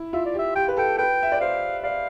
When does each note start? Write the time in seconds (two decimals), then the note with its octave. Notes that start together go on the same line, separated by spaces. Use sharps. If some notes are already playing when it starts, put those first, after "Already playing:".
Already playing: E4
0.13 F4 E5
0.26 D5
0.34 G4 E5
0.55 G4 G5
0.68 B4
0.77 A4 G5
0.98 B4 G5
1.23 E5
1.32 D5
1.41 C5 F5
1.83 D5 F5